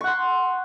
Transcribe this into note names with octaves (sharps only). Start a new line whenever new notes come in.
F#5 C6 C#6